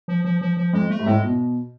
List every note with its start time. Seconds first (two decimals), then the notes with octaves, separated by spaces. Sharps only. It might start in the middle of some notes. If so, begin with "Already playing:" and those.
0.08 F3
0.25 F3
0.41 F3
0.57 F3
0.73 F2 G#3
0.90 A3
0.99 G#2
1.06 A2 G#3
1.24 B2